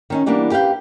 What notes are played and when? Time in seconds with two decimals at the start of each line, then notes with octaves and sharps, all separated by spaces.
0.10 D#3 C#4 D#4
0.26 E3 G3 A#3 B3 D4
0.51 G4 B4 F5 G5